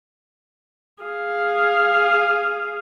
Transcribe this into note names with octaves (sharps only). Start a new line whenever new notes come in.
G#4 F5